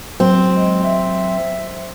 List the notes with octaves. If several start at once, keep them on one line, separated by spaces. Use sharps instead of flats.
F#3 C4
G#3
E5